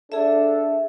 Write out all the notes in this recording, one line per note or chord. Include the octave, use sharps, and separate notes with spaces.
D4 G#4 A4 E5